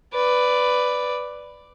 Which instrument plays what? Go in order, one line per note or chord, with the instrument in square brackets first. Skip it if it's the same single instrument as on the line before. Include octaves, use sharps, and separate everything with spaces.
[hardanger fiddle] B4 D5